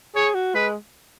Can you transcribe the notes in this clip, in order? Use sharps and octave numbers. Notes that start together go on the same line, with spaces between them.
G#4 C#5
F#4
G#3 B4